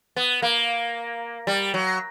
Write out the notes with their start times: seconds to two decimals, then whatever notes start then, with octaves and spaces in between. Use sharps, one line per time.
0.16 B3
0.42 A#3
1.47 G3
1.74 F#3